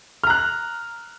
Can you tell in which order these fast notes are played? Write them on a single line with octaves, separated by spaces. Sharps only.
F6 A#5 F#6